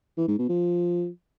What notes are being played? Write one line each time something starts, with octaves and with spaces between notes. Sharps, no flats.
E3
G#2
B2
F3